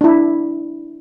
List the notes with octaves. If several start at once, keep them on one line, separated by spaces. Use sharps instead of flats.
D4 E4